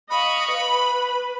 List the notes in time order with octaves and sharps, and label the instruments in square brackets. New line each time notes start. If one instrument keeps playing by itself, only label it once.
[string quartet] D#5 F5 C#6 [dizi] B5
[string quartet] B4